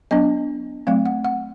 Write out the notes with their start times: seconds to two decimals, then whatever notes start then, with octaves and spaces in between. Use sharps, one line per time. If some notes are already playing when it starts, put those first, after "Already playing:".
0.11 F#3 B3 D4 D#5
0.87 F#3 A3 C4 F5
1.06 F#5
1.24 F#5